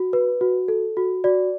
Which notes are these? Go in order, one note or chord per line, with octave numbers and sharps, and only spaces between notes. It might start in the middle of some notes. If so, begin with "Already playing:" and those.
Already playing: F#4
B4
F#4
A4
F#4
F#4 D5